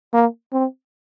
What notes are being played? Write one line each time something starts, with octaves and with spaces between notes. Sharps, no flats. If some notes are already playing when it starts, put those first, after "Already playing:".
A#3
C4